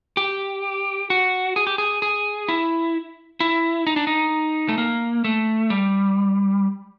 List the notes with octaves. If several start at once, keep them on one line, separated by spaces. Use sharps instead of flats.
G4
F#4
G#4
G4
G#4
G#4
E4
E4
D#4
D4
D#4
A3
A#3
A3
G3